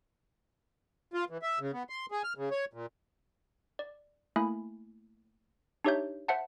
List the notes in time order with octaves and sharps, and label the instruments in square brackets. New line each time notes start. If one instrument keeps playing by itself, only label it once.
[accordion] F4
E3
E5
C#3
B3
C6
G#4
F6
C#3
C#5
A#2
[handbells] D5
A3 A#3 E4 G#5 B5
D4 D#4 G4 C#5 E5 G6
C5 E5 F#5 A5